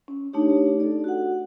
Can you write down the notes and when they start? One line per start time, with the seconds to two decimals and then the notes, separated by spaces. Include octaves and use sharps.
0.08 C#4
0.33 A3 D4 D#4 G4 C#5
0.80 A4 D5
1.04 F#4 F#5